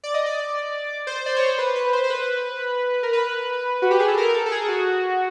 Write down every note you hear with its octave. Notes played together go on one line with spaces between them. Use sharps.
D5
D#5
D5
C5
D5
C#5
C5
B4
B4
C5
C5
B4
A#4
B4
F#4
G4
G#4
A4
A#4
A4
A4
G#4
F#4